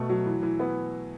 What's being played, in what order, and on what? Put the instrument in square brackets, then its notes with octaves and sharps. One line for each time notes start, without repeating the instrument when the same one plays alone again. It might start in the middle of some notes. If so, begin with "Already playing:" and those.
Already playing: [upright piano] B2 A3
F#3
E3
E3
B3